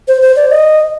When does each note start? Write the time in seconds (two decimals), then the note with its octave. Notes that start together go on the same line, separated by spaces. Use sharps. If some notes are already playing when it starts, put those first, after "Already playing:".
0.08 C5
0.22 C5
0.36 D5
0.50 D#5